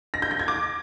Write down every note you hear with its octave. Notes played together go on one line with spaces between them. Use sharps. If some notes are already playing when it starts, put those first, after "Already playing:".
A#6
G6
A#6
G#6
D6